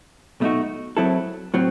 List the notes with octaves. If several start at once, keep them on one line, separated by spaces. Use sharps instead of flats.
B1 B2 A3 D#4 F#4
F#2 F#3 C4 E4 A4
A2 F#3 C4